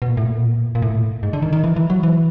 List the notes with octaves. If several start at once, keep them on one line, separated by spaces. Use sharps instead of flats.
B2
A#2
A2
A#2
A#2
A2
G#2
D3
D#3
D#3
E3
E3
F#3
E3